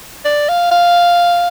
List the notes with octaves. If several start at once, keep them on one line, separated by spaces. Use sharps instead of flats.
D5
F5
F5